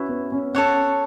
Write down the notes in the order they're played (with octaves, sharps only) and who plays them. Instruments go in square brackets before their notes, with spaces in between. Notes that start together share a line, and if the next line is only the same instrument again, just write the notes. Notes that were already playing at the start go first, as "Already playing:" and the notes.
Already playing: [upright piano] C#4 F#4 [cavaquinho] E4 B4 C#6
[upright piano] B3
C#4
[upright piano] C#4 [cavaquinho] A4 C#5 F#5